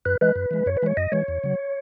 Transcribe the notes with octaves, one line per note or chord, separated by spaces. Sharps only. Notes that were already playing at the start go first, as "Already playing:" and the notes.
F#2 B4
E3 G#3 B4
F#2
E3 G#3
F#2 C#5
B4
E3 G#3 C#5
F#2 D#5
E3 G#3 C#5
E2
C#3 F#3